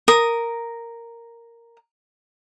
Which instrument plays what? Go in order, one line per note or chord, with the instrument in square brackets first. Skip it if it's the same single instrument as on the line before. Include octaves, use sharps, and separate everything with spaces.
[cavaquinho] A#4 D#6